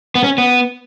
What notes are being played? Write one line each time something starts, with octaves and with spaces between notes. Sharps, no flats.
B3
C#4
B3